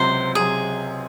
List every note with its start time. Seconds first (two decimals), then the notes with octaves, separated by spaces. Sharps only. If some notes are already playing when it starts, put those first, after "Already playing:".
Already playing: C#2 C3 F#3 C4 C5
0.35 C3 F#3 C4 G#4